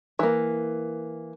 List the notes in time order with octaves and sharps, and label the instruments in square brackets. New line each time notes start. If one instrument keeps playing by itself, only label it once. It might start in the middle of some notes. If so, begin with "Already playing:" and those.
[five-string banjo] E3 A#3